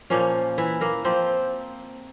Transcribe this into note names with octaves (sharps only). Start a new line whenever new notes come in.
A#2 F3 A#3 C#4
E3 E4
A#3 A#4
F3 A#3 C4 C5